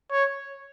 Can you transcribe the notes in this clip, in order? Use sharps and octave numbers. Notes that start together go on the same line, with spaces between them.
C#5